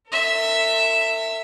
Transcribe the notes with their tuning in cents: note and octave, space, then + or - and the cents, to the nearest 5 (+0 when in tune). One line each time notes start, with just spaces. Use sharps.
A4 +45 E5 +0